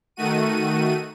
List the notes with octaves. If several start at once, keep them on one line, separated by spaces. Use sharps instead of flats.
D#3 A3 F#4 D#7